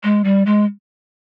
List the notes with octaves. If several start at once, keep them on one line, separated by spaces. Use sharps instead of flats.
G#3
G3
G#3